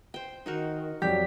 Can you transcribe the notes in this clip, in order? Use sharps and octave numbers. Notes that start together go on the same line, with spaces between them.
C5 G5
D#3 D#4 F#4 A#4
F2 F#3 G4 D5 B6